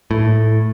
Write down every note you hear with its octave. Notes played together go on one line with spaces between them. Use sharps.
A2